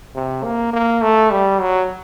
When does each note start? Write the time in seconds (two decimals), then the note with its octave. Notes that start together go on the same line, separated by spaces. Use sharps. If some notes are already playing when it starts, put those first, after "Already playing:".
0.15 C3
0.44 A#3
0.73 A#3
1.02 A3
1.31 G3
1.61 F#3